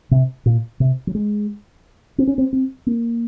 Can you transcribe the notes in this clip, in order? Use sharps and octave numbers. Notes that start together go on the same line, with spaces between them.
C3
A#2
C3
F#3
G#3
C4
C#4
C4
C4
A#3